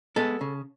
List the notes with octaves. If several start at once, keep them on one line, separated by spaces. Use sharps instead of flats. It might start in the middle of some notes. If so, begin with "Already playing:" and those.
G#3 B3 A4
C#3